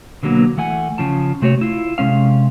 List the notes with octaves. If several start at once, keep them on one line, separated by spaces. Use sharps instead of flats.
B2 D3 F3 F#3 A#3 B3
E3 A3 F#5 G#5
C#3 F3 A5
C3 A3 F#4 C5 C#5
E4 F4
C3 G#3 C#4 F5